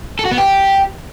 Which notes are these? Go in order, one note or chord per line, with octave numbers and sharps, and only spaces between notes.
A4
F#4
B3
G4